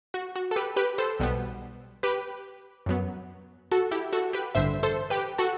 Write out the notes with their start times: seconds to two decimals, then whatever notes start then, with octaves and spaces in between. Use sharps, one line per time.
0.14 F#4
0.36 F#4
0.51 A4
0.56 G4 B4
0.76 G4 B4
0.98 A4 C5
1.20 B1 B2 G3 B3
2.03 G4 B4
2.86 F#2 F#3 B3
3.72 F#4 A4
3.91 E4 G4
4.13 F#4 A4
4.33 G4 B4
4.55 A1 G2 D3 C5 E5
4.83 A4 C5
5.10 G4 B4
5.38 F#4 A4